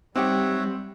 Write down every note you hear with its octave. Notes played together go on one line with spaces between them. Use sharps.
G3 C4 D#4 G4 C#5 E5 F#5 G5